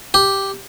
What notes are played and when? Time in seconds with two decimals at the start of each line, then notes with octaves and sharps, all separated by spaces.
0.14 G4